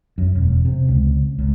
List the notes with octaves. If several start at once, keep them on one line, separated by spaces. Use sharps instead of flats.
F#2
E1
C3
C#2
C#2